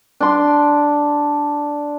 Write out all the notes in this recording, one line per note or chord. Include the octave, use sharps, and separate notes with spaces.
D4 C6